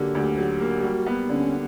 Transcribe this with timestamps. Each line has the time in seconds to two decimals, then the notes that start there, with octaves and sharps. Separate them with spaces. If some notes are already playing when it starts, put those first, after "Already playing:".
Already playing: D3 F#3 A#3 G4
0.15 D2
0.38 F#3
0.60 A#3
0.83 G3 F#4
1.07 B3
1.29 D3 C#4